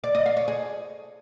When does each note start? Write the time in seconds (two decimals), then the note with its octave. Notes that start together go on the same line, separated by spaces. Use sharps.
0.04 D5
0.15 D#5
0.26 F5
0.37 C#5
0.48 G#4